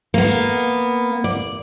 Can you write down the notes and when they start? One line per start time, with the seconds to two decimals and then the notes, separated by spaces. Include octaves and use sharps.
0.14 A#3 B3
1.24 D5